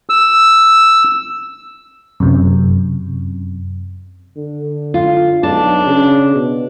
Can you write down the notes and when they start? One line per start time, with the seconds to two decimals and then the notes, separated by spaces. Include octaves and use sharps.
0.10 E6
2.20 F#2 C3
4.37 D3
4.94 F4
5.43 B1 D4 A5
5.86 C#3
6.35 B2